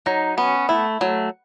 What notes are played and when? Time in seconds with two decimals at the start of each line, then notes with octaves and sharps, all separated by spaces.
0.06 F#3 D#4
0.37 B3 C#4
0.69 A3 E4
1.01 F#3 A3